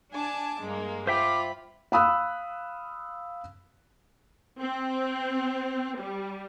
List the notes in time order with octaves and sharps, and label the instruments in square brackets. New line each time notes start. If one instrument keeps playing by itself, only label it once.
[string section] D4 A5 [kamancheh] G#5 D6
[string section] G2 A#3 [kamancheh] G#3
[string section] F4 [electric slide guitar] C5 E5 G5 [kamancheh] B5 [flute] D6
[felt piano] F5 B5 D#6 E6 F#6
[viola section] C4
G3